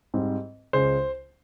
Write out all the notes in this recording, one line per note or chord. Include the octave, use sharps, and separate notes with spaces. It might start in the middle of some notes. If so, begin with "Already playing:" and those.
G#2 G3 C4
C#2 C#3 G#3 C#4 C5